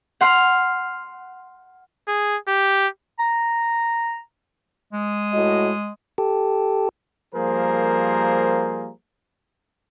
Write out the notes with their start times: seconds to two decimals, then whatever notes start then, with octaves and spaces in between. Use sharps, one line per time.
0.21 F#5 C6 F6
2.08 G#4
2.48 G4
3.19 A#5
4.93 G#3
5.32 A2 F#4 D#5
6.18 G4 A4
7.34 F3 G3 A#3 G#4 A#4 C5